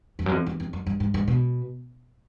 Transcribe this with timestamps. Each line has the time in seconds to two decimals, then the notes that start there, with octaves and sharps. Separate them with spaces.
0.19 F2
0.26 F#2
0.32 F2
0.47 E2
0.60 F2
0.73 F#2
0.86 G2
1.00 G#2
1.14 G#2
1.28 B2